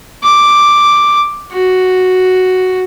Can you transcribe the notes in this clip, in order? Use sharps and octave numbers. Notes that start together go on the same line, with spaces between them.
D6
F#4